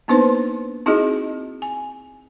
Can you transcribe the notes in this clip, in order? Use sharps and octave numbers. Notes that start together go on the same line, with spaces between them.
A#3 B3 D4 D#4 B4 C5
C4 D#4 E4 F#4 G#4 D#5
G#5